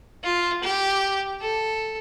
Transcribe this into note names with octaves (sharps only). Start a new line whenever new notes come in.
F4
G4
A4